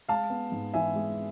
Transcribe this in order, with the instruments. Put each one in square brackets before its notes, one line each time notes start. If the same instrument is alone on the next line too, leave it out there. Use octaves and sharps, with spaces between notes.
[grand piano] G#3 F5 A5
B3
G#2
E3 E5 G#5
G#3